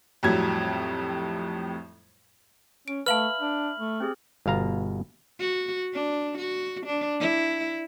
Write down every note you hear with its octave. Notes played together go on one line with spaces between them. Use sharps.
F2 A2 F#3 G3 G#6
C#4 D7
A3 B4 E5 F5 A5 B5 F6 F#7
D4
A3
C4 G4 G#4
G1 B2 F5 A#5
F#4
D4
F#4
D4
E4